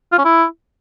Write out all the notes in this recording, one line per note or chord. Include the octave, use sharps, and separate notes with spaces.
F4
C#4
E4